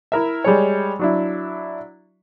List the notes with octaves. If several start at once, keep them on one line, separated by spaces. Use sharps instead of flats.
E4 A#4 E5
G3 G#3 C#5
F#3 D4 E4